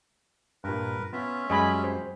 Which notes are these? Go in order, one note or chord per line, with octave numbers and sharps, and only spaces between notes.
G2 A#2 A#4 B4
B3 C#4 F4 E5
F#2 G3 G#3 D#5 G#5 B5
C5